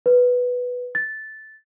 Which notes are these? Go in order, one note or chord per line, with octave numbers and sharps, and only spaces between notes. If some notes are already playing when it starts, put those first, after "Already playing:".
B4
A6